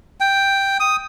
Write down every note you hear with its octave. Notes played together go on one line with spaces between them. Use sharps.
G5
D#6